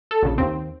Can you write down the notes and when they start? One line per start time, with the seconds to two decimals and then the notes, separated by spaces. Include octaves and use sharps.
0.11 A4
0.23 A#1 C#3
0.38 D#2 C4